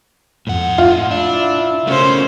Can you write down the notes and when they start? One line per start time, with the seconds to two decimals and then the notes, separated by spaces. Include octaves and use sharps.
0.47 F2 A2 F#5
0.78 F2 F4
1.11 D4 E4
1.87 C#3 A3 C#4 F#4 A#4 C5